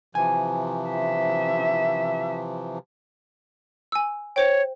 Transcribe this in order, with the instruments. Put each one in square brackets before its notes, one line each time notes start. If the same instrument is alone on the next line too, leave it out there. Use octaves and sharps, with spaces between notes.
[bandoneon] C3 E3 F3 [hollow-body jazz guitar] G#5
[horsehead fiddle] E5
[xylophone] G#5 E6
[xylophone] C5 G5 [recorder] C#5